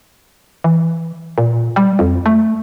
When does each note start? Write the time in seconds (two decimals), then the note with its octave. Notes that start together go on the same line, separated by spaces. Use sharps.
0.64 E3
1.38 A#2
1.76 G3
1.99 F2
2.26 A3